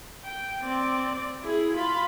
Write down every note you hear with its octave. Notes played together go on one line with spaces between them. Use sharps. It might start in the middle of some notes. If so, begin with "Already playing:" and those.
G5
C4 D5
E4 G#4
F4 B5